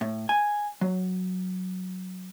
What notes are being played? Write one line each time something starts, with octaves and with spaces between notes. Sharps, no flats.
A2
G#5
F#3